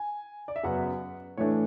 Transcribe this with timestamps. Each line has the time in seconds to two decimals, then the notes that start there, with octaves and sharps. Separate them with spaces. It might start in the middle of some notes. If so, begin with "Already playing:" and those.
Already playing: G#5
0.48 D5
0.56 E5
0.63 F#2 C#3 F#3 B3 F#5
1.37 A2 E3 A3 D4 C#5